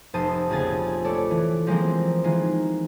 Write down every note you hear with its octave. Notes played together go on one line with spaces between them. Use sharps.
F1 C5 A5 D#6 D#7
A#1 F2 C#3 G#4 G#5 A6
A3 A4 C#5 D5
E3
F3 G#3 A#3 C4
D#3 E3 G#3 F4